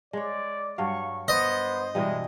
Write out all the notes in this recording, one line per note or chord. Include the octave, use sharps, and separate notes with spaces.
G#3 C#5 D5
G2 F#3 F5 C#6
B3 C5 D#5
B2 E3 G3 G#3